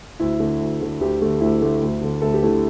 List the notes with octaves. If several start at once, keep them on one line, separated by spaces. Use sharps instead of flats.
D2 E4
D3 A3
D2
D3 A3
D2 G4
D3 A3
D2 E4
D3 A3
D2
D3 A3
D2 A4
G4
D3 A3 E4